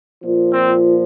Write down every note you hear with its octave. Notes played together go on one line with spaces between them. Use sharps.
A#2 F3
C4